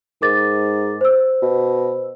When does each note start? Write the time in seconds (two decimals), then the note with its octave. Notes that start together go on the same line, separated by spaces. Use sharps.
0.22 G#2 A#4 D6 A6
1.01 C5 E6
1.42 B2